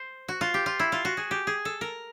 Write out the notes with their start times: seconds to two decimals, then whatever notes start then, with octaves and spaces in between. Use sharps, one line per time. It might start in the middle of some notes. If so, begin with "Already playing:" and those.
Already playing: C5
0.28 F#4
0.41 F4
0.54 G4
0.66 F4
0.80 E4
0.92 F4
1.05 F#4
1.17 G#4
1.31 G4
1.47 G#4
1.65 A4
1.81 A#4